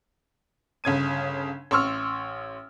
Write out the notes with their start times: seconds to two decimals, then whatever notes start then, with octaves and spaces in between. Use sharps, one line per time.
0.84 G1 C#3 G#6 D#7
1.71 A1 C6 C#6 E6 F6